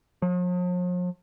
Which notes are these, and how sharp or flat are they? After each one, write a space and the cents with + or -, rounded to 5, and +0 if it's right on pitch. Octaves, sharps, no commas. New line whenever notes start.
F3 +45